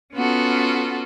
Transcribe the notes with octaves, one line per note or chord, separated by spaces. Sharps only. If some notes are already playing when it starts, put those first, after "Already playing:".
B3 C#4 F4 F#4 A4